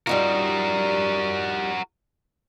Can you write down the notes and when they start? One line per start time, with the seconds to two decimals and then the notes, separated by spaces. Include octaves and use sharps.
0.07 G3 D#4 F4 F#4 A#4